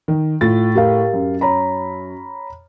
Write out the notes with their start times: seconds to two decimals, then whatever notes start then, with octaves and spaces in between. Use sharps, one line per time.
0.08 D#3
0.41 A2 F4 A6
0.75 G4 A#4 F5
1.13 F#2
1.41 C#5 A#5 B5